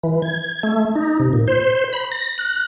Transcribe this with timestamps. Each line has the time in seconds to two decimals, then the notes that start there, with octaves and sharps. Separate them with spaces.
0.03 E3
0.22 G#6
0.63 A3
0.95 D#4
1.20 C3
1.33 A#2
1.48 C5
1.93 B5
2.12 A#6
2.38 F#6